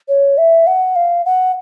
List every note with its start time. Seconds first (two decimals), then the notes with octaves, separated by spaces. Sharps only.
0.09 C#5
0.38 E5
0.67 F#5
0.96 F5
1.26 F#5